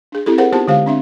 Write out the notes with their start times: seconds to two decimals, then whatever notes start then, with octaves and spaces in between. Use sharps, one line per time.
0.12 D4 G#4
0.26 C4 E4 G4 A4
0.38 G#4 A#4 C5 F#5
0.52 B3 D#4 F4 G4 C5 A5
0.68 D3 G#3 G4 C5 F5
0.86 C4 D4 E5